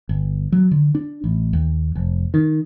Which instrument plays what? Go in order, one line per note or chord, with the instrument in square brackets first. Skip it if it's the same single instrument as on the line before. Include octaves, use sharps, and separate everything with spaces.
[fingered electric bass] G1
F#3
D3
D4
A1
D#2
F1
D#3